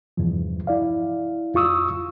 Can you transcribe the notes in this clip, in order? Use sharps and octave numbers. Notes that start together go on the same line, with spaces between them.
E2 G2 C3 F3
E4 D5 F5
F2 F4 C#6 D#6 E6